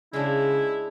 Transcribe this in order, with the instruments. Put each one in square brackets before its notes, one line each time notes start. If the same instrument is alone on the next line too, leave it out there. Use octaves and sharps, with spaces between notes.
[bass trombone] C#3 [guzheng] G#3 C#4 D4 [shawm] E4